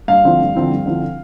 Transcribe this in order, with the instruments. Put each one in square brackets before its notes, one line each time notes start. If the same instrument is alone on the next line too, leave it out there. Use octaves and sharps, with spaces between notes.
[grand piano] G2 F5
D3 F3 C4 E4
G2
D3 F3 C4 E4
G2
D3 F3 C4 E4